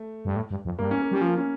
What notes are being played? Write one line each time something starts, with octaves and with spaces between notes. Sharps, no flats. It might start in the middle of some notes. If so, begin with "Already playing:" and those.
Already playing: A3
G2
A2
G2
F2
G2 A#3
C#4
A#3
G3 C#4
F3 A#3
C#4